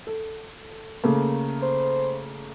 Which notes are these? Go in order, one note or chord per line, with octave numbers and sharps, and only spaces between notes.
A4
C#3 A3 A#3
C5